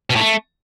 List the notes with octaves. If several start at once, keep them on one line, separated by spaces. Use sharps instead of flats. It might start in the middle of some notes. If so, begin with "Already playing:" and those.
B2
A2
A3